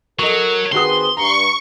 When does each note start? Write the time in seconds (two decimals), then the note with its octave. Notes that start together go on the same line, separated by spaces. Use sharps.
0.19 F#3 A4 A#4 D#5 C#6
0.72 D#3 C4 F#4 G#4 B4 C6 D#6
1.17 G2 A#5 C#6